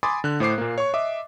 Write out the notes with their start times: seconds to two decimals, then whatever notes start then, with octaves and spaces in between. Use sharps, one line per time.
0.03 G#5 B5 C6 D6 D#6 A6
0.24 D3 F#6
0.40 A2 C5 D6 C7
0.58 A#2 A#3
0.78 C#5 C#6
0.94 D#5 E5 D6